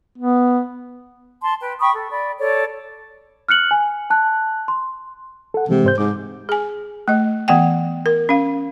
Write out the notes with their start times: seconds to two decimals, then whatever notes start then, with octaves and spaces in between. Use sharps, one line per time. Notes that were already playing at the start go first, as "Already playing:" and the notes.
0.18 B3
1.42 A5 C6
1.60 B4 G5
1.80 G5 B5 C#6 D#6
1.93 A4
2.10 D5 B5
2.39 A4 C#5 D5
3.48 F6 F#6 C#7 F#7
3.71 G#5
4.10 A5 F#6
4.68 C6
5.54 A4 F#5
5.69 C3 E3 G#3
5.84 G#2 C5 G6
5.98 G#2 D6
6.49 G#4 G#5
7.08 A3 D#5
7.48 E3 B3 F#5 G5
8.06 A#4
8.29 C#4 F5